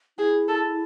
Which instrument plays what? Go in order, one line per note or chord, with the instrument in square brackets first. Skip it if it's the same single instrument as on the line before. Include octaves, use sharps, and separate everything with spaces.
[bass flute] E4 [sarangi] G#4
[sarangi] A4